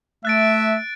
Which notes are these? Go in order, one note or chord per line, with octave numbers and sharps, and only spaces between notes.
A3 E5 F#6 A6 D7